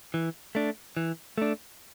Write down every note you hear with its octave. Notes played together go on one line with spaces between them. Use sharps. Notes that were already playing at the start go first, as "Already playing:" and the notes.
E3
A3 D4
E3
A3 D4